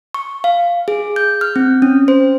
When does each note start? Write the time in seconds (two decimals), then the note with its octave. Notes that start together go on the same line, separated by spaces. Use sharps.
0.14 C#6
0.44 F5
0.88 G#4
1.16 G6
1.41 F6
1.56 C4
1.82 C#4
2.08 C5